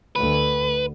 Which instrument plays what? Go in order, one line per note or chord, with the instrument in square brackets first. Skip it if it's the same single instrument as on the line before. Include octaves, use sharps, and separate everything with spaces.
[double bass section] D2 [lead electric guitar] B4